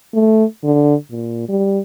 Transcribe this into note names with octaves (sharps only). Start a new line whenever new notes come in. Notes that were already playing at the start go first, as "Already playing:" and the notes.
A3
D3
A#2
G3